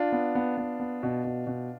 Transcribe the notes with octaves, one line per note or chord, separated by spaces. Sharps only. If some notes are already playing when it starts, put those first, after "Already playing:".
Already playing: D4 F4
B3
B3
B3
B3
B2
B2
B2